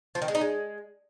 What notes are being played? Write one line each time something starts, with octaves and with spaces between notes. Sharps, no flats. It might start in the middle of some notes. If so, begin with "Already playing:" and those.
F3
D#3
G#3
D#4
G#3